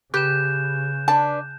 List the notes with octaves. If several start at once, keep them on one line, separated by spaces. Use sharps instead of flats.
C#3 G4 B4 F#6 G6 E7
D4 B4 A5